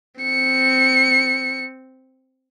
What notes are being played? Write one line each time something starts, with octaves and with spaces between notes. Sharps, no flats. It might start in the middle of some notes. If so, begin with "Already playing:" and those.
C4 C#7